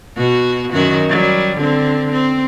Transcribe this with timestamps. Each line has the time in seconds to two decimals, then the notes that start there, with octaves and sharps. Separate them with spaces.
0.17 B2 F#4
0.73 F#2 D#3 F#4
1.09 F#3 G3
1.57 D3 C4
2.12 C4